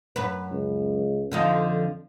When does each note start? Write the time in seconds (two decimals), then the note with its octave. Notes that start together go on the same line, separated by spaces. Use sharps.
0.16 F#2 B4
0.51 C#2
1.32 F2 D3 F3 D#4